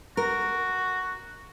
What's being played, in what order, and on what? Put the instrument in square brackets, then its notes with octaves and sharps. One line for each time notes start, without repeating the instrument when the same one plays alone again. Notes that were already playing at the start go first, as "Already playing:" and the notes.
[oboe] F#4 [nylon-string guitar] A#4